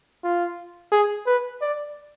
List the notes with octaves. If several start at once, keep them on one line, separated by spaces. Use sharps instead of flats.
F4
G#4
B4
D5